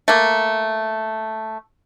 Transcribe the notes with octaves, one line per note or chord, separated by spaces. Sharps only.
A3 A#3